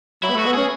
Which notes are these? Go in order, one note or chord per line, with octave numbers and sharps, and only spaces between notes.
F#3 E4
B3
A3 F#4
B3
C#4 G#4